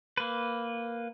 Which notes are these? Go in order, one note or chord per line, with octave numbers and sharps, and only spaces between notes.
A#3 B4